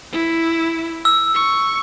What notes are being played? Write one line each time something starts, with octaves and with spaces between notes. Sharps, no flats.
E4
E6
C#6